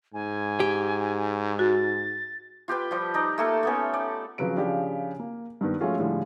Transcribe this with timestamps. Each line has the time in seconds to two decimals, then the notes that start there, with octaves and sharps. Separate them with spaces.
0.14 G#2 G#5
0.60 G4
1.59 F#4 A6
2.68 F4 G4 B4 G5
2.91 F3 G3
3.14 D#4 D5 A#5
3.38 A3 A#3 A4
3.63 A3 B3 C#4
3.94 D5
4.38 C#3 F3 F#3 B4 D7
4.57 C#3 F3 D4 G4
5.19 A#3
5.61 G2 D#3 B3
5.80 F3 G#3 A3 C#4 F4 F#4
5.99 A2 D3 F3 G3 G#3